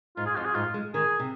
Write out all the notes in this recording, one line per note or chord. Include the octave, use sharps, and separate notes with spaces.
G#2 F4
G#4
F2 F4
G#4
G#2 F4
G#3
D#3 G#4
C3